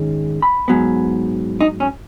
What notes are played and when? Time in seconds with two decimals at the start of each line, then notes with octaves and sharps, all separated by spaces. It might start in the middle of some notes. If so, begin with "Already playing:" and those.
Already playing: G#2 D#3 G#3 C#4
0.42 B5
0.68 G#2 F#3 B3
1.61 D#4
1.80 C#4